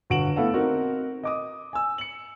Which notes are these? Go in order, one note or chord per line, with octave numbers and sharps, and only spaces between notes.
G1 F#4 F#5 D7 E7 F#7
A3 B3 E4 A4 F5 F#5
C4 D#4 F#4 A#4
D#5 D6 D#6
G#5 E6
C#7 F#7